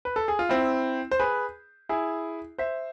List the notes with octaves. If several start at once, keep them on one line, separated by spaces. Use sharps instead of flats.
B4
A4
G#4
F4
C4 E4
C5
G#4 B4
E4 G#4
C5 E5